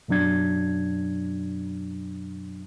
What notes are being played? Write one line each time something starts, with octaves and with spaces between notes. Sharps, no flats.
F#2 B2 F#3 D4 G#6